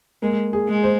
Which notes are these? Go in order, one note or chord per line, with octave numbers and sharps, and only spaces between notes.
G#3 A#3
G#4
G#3
C5